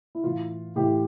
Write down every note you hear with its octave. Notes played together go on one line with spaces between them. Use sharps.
E4
A2 E3 F4
A2 E3 G4